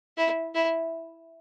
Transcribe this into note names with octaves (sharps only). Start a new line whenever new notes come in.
E4
E4